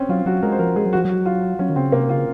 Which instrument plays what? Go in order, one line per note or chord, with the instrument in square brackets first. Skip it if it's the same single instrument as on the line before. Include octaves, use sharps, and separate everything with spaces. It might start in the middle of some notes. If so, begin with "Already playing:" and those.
Already playing: [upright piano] C4 C#4
[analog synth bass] F#3 [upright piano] F4
[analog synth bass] F#3 [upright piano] F#4
[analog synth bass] G#3 [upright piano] A#4
[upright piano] C5
[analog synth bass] F3 [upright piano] A#4
[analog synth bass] G#3 [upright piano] G#4
[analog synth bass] F#3
[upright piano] F#4
[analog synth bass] F3
[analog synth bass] F#3 [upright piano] F#4
[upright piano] F4
[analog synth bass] F#3 [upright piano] C#4
[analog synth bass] D#3
[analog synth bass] C#3 [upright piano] C4
[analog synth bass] C3 [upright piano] A#3
[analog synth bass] C#3 [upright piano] F4